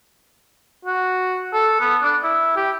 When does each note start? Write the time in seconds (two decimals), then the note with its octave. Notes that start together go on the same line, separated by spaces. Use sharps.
0.85 F#4
1.53 A4
1.81 B3
2.03 D4
2.24 E4
2.56 G4